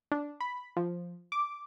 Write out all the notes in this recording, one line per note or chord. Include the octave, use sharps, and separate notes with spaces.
D4
B5
F3
D6